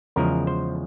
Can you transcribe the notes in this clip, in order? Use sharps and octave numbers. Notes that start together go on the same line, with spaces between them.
E2 C#3 F3 G#3 A#4
C5